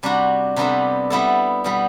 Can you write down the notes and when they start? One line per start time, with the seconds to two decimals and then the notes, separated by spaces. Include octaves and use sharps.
0.03 C3 G3 D4 F#4
0.56 C3 G3 B3 D4 A4
1.10 G3 B3 E4 A4
1.64 B2 G3 B3